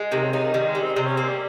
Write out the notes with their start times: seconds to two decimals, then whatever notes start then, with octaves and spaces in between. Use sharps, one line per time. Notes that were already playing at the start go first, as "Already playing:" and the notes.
Already playing: G#3
0.12 C3 D#3
0.22 C#3
0.33 C#3 D#4
0.43 D#3
0.54 D#3 G3
0.68 G#3
0.75 G3
0.82 C4
0.96 C3 C4
1.06 C#4
1.17 A#3 C4
1.28 G3